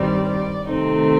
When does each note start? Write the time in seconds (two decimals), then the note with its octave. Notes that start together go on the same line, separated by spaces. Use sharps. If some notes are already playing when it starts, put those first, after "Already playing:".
Already playing: G2 D#3 G3 C4 D5
0.30 D5
0.69 C3 D#3 A3 C4 D#4